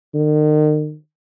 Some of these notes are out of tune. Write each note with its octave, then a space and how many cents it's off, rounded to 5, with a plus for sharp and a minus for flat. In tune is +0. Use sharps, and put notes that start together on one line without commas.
D#3 -40